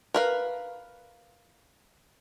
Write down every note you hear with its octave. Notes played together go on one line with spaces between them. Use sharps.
A#4 B4 F5